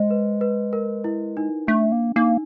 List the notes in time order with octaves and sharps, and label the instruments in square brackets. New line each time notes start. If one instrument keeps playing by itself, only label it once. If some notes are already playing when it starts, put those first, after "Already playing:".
Already playing: [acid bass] G#3 [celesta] C5
[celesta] B4
B4
A#4
E4
D#4
[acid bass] A3 [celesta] D4
[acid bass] A#3
[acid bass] A#3 [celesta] D#4